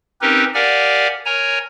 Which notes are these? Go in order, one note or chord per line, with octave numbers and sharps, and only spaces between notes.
C4 C#4 D#4 G4 A#4 B4
G4 A#4 D5 F5 F#5 G#5
A#4 C#5 G#5 A#5